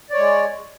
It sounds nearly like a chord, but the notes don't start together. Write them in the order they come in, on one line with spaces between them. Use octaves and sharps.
D5 C#5 G#3